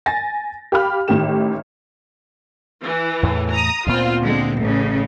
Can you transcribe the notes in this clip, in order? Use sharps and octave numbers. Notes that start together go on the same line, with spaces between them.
G#5 A6 A#6
G4 F5 B5 F6
A1 A2 D#3 G4 E7
E3
E2 A2 A3
A#5 D#6
D2 A#2 B3 C4 F4
D3 G#3 C4
A1 A2 C#3